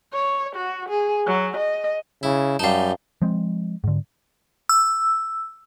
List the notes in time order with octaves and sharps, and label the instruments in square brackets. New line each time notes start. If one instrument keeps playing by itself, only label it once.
[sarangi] C#5
F#4
G#4
F#3
D#5
[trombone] C#3 [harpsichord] E4
[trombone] F#2 [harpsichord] G3 D#4 [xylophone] F5 A5
[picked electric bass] F3 G#3 C4
G#2 D3
[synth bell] E6